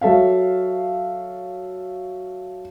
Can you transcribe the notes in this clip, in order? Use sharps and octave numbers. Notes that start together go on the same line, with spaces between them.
F#3 A4 E5 F5